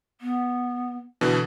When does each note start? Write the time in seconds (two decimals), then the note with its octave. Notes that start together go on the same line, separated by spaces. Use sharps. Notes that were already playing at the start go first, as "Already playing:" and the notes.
0.21 B3
1.21 B2 D3 E3